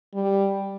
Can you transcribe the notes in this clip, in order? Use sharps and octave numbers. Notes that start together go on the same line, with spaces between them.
G3